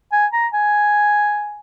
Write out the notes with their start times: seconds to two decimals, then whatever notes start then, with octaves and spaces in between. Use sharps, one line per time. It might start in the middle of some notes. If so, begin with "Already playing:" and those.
0.12 G#5
0.33 A#5
0.53 G#5